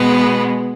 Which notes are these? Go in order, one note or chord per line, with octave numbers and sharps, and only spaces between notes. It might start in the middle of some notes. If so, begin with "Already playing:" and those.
Already playing: B2 G#3 B3